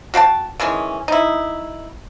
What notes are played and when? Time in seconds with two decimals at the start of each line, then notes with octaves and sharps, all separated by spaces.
0.14 F#4 F5 G5 A5
0.60 D#3 E3 G#3 C#4
1.08 D#4 E4